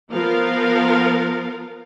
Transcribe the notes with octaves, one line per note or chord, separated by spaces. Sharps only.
F3 B3 F4 A#4 F5